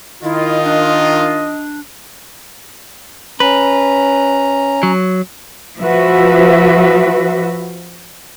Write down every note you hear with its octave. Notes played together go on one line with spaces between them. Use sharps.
D#3 E4 F4 D#5
D4
C#4 B4 A#5
F#3
F3 F#4 B4 E5